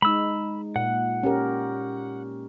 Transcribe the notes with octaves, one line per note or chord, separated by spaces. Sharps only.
G#3 D#4 B5 E6
A#2 F#5
C#4 G4 A#4